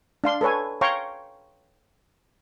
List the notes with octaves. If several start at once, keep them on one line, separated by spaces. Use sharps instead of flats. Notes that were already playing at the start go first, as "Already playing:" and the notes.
D4 F5 C6
A4 B4 C#5 G#5
C#5 F5 G5 A#5 C6 C#6